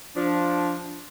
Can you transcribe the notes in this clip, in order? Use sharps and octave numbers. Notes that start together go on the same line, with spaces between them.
F3 D4